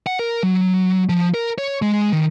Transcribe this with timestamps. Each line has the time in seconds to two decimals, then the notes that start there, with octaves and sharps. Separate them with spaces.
0.07 F#5
0.19 A#4
0.43 F#3
1.09 F3
1.34 A#4
1.58 C#5
1.82 G#3
2.13 D#3